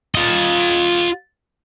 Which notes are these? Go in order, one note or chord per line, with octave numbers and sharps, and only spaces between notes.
F4 D#5